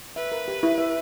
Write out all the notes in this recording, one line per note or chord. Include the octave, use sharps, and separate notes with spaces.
B4 E5
A#4
G4
E4
E5